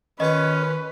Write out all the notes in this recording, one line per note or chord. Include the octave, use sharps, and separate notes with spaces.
D#3 C#4 F4 B4 D#5